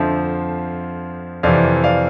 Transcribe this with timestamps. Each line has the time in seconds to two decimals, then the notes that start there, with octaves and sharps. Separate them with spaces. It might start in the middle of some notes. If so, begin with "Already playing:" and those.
Already playing: F2 D3 F3 C5 E5
1.43 F2 C3 E3 D5 F5
1.84 D5 F5